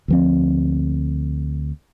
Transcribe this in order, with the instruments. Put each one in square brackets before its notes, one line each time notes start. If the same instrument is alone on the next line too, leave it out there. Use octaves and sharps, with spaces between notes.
[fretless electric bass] D2 F3 C4